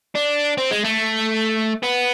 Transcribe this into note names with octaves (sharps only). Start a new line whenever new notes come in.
D4
C4
G#3
A3
B3